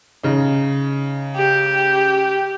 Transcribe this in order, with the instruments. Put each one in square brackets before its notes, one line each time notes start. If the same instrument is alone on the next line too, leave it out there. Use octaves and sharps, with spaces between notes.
[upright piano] C#3 D#4
[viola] G4